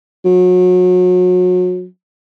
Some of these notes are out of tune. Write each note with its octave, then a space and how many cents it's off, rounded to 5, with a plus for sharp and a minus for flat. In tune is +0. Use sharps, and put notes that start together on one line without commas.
F#3 -30